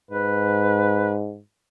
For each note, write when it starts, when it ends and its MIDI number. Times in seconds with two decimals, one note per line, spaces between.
0.11 1.40 44
0.11 1.15 71